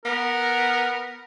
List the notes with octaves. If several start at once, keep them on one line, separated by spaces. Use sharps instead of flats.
B3 A#4